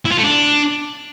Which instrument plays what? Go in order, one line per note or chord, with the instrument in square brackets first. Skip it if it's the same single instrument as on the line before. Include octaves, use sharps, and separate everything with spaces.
[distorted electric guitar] E4
F4
A3
D4